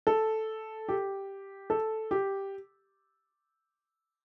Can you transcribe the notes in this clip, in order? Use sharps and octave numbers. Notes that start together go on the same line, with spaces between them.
A4
G4
A4
G4